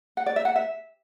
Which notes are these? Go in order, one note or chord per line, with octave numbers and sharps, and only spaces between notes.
F#5
D5
E5
F#5
E5